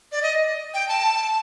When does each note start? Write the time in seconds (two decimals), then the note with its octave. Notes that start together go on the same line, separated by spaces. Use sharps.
0.12 D5
0.22 D#5
0.74 G5
0.88 A5